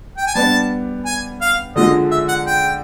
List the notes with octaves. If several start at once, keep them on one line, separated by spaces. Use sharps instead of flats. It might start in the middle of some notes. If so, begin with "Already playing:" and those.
G5
G#5
G3 B3 D4 A5
G#5
F5
D3 F3 G#3 D#5
E5
F#5
G5